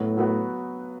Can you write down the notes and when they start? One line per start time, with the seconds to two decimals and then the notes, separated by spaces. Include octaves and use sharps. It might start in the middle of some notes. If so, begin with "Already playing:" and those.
Already playing: A2 F#3 B3 F#4 B4
0.17 F#3 B3 F#4 B4